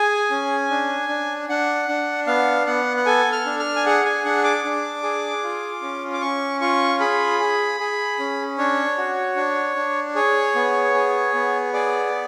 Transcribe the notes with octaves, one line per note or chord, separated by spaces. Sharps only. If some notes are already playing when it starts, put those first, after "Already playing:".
Already playing: G#4 G#5
C#4
D4
D4
D4 F#5
D4
B3 F5
B3 F#5
F#5
A4 G#5
F6
D4
F6
G#5
G#4 F#5
G#5
D4 F#5
D6
D4
G#4
F4
C#4
D6
C#4 C#6
F4 C#6
G#4 B5
G#4
G#4
C#4
D4 C#5
F#4
D4
D4
G#4 C#5
B3
G#4
B3
G#4 D5